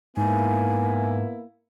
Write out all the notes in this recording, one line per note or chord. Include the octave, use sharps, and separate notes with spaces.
G#2 A#3 B3 E4 G#5